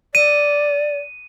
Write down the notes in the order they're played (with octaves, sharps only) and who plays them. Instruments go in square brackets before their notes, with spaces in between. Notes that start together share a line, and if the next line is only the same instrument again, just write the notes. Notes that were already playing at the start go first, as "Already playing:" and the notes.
[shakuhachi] D5 [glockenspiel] D#7